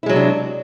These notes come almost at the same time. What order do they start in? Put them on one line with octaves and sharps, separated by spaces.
E4 G#3 F#3 C3 D4